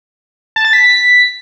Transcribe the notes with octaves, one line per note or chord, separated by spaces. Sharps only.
A5
A6
B6